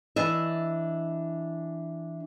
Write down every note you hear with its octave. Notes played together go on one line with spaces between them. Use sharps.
E3 D4 D#5 E5